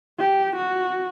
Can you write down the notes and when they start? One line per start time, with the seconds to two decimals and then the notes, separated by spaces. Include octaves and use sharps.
0.19 G4
0.56 F#4